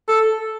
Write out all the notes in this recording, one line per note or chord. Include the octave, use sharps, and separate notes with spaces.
A4